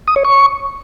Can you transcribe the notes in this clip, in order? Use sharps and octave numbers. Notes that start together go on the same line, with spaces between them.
D#6
C#5
C#6